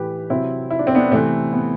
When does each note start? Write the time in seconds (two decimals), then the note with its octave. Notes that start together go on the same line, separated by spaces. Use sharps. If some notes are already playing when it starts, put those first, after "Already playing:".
Already playing: A2 E3 G4 B4
0.30 C3 F#3 C4 E4
0.70 E4
0.79 D4
0.87 C4
0.95 B3 D4
1.11 C3 E3 A3 C4
1.53 B3